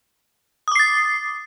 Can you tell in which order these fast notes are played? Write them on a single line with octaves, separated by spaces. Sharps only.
D#6 D6 C7 A6